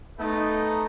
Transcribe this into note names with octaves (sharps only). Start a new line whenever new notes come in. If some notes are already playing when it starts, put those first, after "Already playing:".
A3 B3 D#4